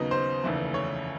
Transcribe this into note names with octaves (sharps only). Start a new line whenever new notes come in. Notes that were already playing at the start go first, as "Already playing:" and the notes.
Already playing: D#2 C#3 F#3 B3 D#4 D#5
C5
F1 D#2 C#3 E3 A3
C#5